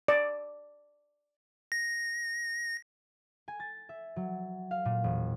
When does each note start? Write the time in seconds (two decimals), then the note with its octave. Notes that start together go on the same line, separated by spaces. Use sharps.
0.08 D5
1.72 A#6
3.48 G#5
3.60 A6
3.89 E5
4.16 F#3
4.71 F5
4.85 A#2
5.04 E1